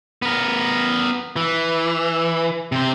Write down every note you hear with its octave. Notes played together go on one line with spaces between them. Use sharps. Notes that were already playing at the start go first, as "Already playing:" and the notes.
B3 A#4
E3
C3 C5